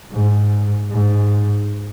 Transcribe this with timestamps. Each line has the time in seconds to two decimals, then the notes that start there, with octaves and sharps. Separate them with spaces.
0.12 G#2
0.91 G#2